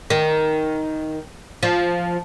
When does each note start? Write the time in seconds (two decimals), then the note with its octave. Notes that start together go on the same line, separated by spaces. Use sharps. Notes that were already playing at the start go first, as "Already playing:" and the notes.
0.10 D#3
1.63 F3